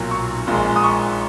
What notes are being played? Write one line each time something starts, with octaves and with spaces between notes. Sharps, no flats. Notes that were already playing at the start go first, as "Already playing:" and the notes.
Already playing: B1 A#2 F#3
C#6
A#1 A#2 G#3
D#6
C#6